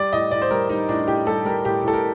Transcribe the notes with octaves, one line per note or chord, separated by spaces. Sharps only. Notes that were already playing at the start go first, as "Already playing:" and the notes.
Already playing: G3 D5
A2 D#5
A2 D5
C5
G3 A#4
G3 D#4
A2 D4
A2 G4
G3 A4
G3 A#4
A2 G4
A2 A4
A#4